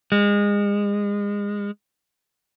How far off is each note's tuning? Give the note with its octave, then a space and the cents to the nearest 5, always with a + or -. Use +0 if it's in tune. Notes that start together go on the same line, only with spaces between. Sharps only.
G#3 -30